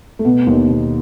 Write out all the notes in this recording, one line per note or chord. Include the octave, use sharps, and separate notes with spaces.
A3
B2 B3
D#2 D#3
B2